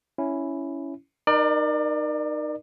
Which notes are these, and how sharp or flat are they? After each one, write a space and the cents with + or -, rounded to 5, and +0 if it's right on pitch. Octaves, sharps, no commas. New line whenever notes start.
C#4 +5 E4 +0
D#4 -20 A#4 +20 D5 +30